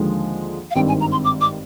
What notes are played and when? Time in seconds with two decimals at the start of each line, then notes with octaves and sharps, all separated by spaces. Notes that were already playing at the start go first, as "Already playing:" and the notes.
Already playing: D#2 D3 F3 G#3
0.71 F5
0.75 G#1 G2 D#3 G3 C4 G5
0.88 G#5
1.01 A#5
1.12 C6
1.24 D6
1.41 D6